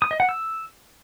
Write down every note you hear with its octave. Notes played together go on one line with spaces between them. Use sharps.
D#6
D#5
F#5
E6